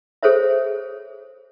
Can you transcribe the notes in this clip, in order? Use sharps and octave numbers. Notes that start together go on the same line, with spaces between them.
G#4 A4 C5 C#5 E5